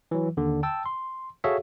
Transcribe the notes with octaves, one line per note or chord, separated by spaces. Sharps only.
E3 F#3
D#2 D3
G5 A5 E6
C6
F#4 G#4 A4 C#5 E5 F5